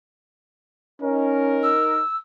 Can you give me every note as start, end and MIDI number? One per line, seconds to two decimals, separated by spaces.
1.02 1.78 61
1.02 1.99 63
1.02 1.99 70
1.63 2.16 88